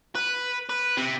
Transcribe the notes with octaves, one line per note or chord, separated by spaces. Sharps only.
B4
B4
C3